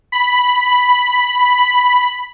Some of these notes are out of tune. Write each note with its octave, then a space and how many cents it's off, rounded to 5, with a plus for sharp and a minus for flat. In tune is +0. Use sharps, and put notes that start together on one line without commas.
B5 +0